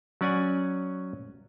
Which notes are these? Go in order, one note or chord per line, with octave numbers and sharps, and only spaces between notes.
F#3 C#4 D5 F#5 G#5